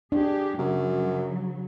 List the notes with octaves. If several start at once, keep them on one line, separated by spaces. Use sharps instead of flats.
D4 G4 G#4
F#2 C#3 F#3